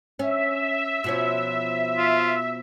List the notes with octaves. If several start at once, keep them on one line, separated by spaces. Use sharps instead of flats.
C#4 E5
B2 F3 C#4
F4